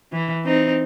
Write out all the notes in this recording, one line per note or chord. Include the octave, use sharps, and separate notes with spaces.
E3
C4 D#4